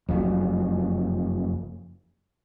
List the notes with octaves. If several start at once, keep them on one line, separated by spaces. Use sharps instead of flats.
F#1 F2